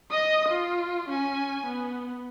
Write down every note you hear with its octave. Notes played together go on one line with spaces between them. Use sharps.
D#5 D#6
F4
C#4 G#5
B3